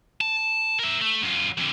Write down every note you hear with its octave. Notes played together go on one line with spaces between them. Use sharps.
A5
A#4 E5
A3
F#2 F4
F2 D3